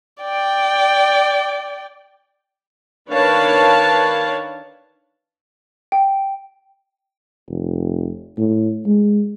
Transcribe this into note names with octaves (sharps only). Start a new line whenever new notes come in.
D5 G5
D#3 D4 B4 C#5 F5 A5
G5
F1
A2
G#3